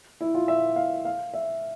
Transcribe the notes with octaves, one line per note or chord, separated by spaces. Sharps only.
E4
F4
E5
F5
F5
E5